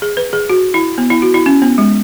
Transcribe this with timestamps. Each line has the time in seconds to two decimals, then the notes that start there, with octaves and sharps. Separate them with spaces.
0.02 G#4
0.17 B4
0.33 G#4
0.50 F#4
0.74 E4
0.98 B3
1.10 E4
1.22 F#4
1.34 E4
1.46 C#4
1.62 B3
1.78 G#3